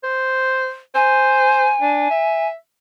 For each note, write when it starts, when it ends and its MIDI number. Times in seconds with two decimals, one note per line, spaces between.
0.04 0.77 72
0.95 1.73 72
0.95 2.48 80
1.81 2.06 62
2.10 2.53 76